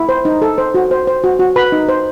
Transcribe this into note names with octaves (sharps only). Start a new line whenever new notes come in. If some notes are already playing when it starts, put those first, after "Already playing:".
Already playing: E4
C5
D#4
A4
C5
F#4
C5
C5
F#4
F#4
F#4 B4 B5
D#4
C5